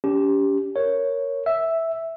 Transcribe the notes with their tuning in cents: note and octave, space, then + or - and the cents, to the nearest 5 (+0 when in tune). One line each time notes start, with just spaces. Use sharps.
C#4 +40 G4 +0
A#4 +0 C#5 +0
E5 -5 E6 +0